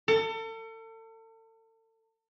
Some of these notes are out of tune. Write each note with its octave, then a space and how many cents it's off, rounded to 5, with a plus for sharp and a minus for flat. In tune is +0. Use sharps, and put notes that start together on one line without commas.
A4 +35